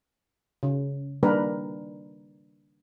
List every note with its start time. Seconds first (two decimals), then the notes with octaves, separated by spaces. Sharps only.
0.63 C#3
1.23 D#3 G3 A#3 D4 A#4 B4